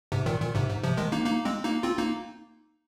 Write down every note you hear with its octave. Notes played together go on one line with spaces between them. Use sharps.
G#2 C3
A#2 D#3
A#2 D#3
G#2 C3
G#2
C3 F3
D#3 G#3
A#3 D#4
A#3 D#4
G#3 C4
A#3 D#4
C4 F4
A#3 D#4